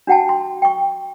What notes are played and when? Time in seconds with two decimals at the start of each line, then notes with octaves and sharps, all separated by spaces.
0.07 D4 F#4 F#5 G5 A5
0.29 C6
0.62 G5 C#6